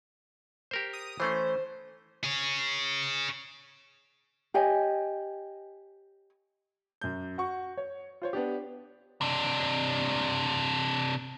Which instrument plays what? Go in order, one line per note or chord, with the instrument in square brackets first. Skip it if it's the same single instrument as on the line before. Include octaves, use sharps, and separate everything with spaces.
[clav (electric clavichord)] G4 A#4 C5
[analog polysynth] D#6
[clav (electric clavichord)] E3 A3 C#4 [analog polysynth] C5
[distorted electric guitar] G#4 C#5
[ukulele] G4 C#5 D#5 G#5
[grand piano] F#2 G6
F#4 C#6
C#5
F4 C5 C#5
B3 D4 G4
[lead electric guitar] C3 D4